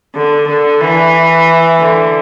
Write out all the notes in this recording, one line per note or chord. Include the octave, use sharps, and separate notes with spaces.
D3
D3
E3
D3